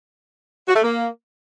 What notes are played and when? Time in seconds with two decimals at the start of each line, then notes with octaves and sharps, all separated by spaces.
0.68 F#4
0.76 A3
0.83 A#3